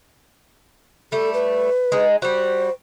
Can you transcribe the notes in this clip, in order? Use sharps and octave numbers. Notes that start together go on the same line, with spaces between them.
G3 A3 A4
B4
G#3 D#4
G3 F#4 C5